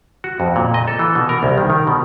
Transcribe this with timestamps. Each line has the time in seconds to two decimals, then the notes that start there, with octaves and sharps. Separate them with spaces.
0.24 F#4
0.40 F2
0.56 A#2
0.74 D#5
0.88 A4
0.99 E3
1.15 B2
1.29 A#4
1.43 C2
1.57 D#3
1.70 D#3
1.87 B2